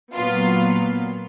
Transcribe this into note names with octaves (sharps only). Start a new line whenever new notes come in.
A#2 F#3 B3 F4